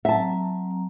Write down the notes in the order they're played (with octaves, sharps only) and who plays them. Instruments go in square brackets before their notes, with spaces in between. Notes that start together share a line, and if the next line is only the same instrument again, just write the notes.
[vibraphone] F#3 C4 A#5 [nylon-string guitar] E5 A5